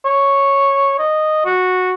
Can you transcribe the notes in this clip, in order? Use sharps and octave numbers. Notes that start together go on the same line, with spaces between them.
C#5
D#5
F#4